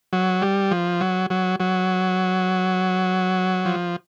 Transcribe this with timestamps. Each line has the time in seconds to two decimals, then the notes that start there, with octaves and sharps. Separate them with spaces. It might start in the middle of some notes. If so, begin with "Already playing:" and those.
0.13 F#3
0.42 G3
0.71 F3
1.01 F#3
1.30 F#3
1.60 F#3
3.65 F3